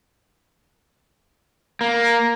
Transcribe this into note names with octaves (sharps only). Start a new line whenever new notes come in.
A#3